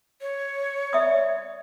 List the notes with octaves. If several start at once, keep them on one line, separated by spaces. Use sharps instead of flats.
C#5
D5 E5 D#6